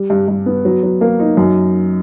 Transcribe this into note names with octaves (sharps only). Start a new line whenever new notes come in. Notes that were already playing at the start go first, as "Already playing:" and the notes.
Already playing: G3
G2
G2
B3
F#3
F#3
A#3
D#4
F#2